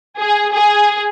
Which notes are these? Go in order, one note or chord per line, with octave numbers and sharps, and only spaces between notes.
G#4
G#4